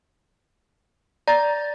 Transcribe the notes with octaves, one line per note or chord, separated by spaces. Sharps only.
D5 A#5 A6